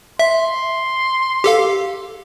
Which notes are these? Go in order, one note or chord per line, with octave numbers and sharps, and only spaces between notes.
E5 C6
G4 A4 F5